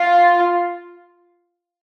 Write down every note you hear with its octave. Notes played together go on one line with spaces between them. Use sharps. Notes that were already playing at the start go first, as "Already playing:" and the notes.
Already playing: F4